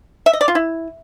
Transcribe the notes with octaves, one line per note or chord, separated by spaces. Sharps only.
E5
D#5
D5
F4
E4